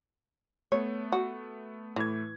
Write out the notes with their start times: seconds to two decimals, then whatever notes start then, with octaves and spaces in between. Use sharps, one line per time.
0.72 A3 B3 C#5
1.12 F#4
1.96 A2 E3 A3 G#6